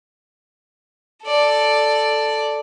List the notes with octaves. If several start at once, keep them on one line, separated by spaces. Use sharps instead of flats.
A4 D5